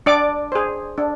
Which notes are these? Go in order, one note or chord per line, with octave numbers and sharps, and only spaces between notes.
D4 D5 D6
G#4 C5
D4